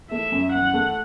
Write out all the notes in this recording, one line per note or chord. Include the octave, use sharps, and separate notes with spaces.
A3 E5
F#2
F#2 F#5
A3